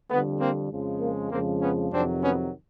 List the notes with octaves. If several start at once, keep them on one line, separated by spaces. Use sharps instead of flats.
F2 D3 G3 A3 B3
A#3 C4
F2 C#3 F3 G#3
A#3
F2 C#3 F3 G#3 A#3 C4
B3 C#4
F2 C3 D#3 F#3 C4 D4
B3 C#4